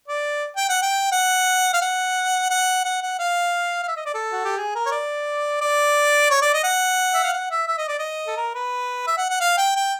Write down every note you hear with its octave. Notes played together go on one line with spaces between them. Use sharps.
D5
G5
F#5
G5
F#5
F5
F#5
F#5
F#5
F#5
F5
F5
E5
D#5
D5
A4
F#4
G4
G#4
A#4
C#5
D5
D5
C#5
D5
D#5
F#5
E5
F5
F#5
E5
E5
D#5
D5
D#5
A4
A#4
B4
E5
F#5
F#5
F5
G5
G5